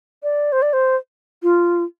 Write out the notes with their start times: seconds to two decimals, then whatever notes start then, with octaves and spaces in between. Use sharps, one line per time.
0.23 D5
0.52 C5
0.62 D5
0.73 C5
1.43 F4